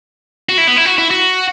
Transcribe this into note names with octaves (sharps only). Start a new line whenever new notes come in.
F#4
E4
B3
E4
F#4
E4
F#4